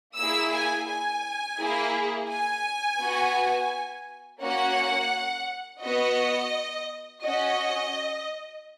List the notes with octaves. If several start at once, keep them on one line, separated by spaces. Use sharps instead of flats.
A#3 E4 G#4 E6
G#5
G#5
A#3 E4 G#4
G#5
B3 F#4
A#3 C#4 F#4 F#5
B3 F#4 D#5
C#4 F#4 D#5